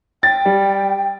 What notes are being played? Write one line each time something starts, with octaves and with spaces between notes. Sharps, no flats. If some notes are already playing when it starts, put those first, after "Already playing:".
G5 A6
G3